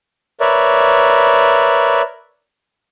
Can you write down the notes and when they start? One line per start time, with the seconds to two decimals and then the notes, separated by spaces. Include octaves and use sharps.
0.40 A#4 B4 C#5 D5 E5